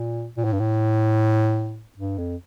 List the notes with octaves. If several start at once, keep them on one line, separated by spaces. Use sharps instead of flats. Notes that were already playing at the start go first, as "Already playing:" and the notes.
Already playing: A#2
A#2
A2
G2
A2
G2
F2